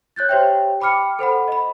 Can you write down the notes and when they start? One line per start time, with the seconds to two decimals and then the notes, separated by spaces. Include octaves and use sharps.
0.16 C#5 F#6 G6 A6
0.29 G4 C5 C#5 E5 G5
0.81 G5 B5 D6 F6 C#7
1.19 A4 C5 F#5 B5
1.48 D#5 B5